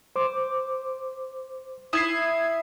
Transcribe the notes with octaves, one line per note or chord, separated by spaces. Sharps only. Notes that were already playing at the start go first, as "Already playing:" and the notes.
C5 D6
E4 D#6 G#6 C7